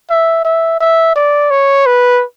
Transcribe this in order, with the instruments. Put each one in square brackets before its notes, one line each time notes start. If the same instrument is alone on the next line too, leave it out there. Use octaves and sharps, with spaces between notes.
[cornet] E5
E5
E5
D5
C#5
B4